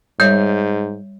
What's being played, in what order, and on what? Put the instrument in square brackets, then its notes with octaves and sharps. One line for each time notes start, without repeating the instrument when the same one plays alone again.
[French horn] G#2 [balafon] G3 C#5 E5 [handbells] G6